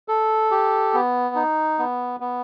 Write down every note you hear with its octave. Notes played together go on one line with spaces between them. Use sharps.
A4
G4
B3
D#4
B3
B3